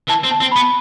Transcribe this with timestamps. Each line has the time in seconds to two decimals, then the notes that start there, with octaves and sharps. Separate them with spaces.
0.09 E3 A5
0.25 C4
0.31 A5
0.42 C4
0.52 B5
0.57 B3